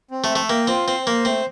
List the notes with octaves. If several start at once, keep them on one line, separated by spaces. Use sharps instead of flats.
C4
A3
E5
A3
A#3 G5
C4 F4
C4 C5
A#3 C5
A3 C4